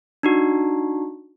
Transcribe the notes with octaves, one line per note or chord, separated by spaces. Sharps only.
D4 D#4 F#4